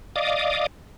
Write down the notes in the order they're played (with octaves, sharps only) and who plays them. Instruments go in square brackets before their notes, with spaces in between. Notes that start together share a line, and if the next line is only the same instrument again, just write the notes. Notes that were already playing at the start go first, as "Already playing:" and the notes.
[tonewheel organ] D5 D#5 F5 D6 D#6